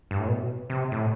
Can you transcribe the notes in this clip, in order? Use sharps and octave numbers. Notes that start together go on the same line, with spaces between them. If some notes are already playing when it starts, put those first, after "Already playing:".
G2
A2
B2
C3
A2